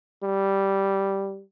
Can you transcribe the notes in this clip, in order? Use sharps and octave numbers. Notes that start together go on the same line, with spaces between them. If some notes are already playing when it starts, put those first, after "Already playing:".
G3